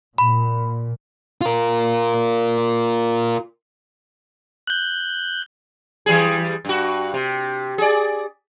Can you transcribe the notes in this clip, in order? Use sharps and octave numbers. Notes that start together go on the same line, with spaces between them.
A#2 B5
F4 A#4
F#6 G6
E3 G3 G#4
G2 F#4
C3
G#4 D5